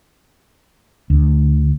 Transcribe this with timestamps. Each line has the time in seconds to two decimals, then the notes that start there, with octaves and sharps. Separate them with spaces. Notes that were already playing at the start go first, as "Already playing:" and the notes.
1.10 D2